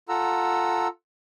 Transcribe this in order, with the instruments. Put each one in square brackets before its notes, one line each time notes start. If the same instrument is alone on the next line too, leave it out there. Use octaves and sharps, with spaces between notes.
[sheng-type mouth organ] F4 A4 F#5 A#5 E6